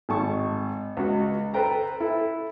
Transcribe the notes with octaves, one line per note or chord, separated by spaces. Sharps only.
G#1 A5 C#6
C#2 F#4
A4 B4 C5 G5 A#5
E4 A4